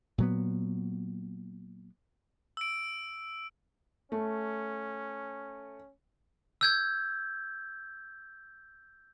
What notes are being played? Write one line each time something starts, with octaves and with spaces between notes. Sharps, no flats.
A#2 F#3 B3
E6 D7
A3 C#4
E6 G6 G#6